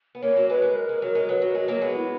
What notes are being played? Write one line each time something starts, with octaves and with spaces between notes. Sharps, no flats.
B3
A#3 C#4 C#5
F#3 A#3
G#3 B4
G#3
A#4
G#3
F#3
G#3
F#3 B4
F#3
B4
G#3 A#4
F#3 A#3
G#3 B3 G#4
E4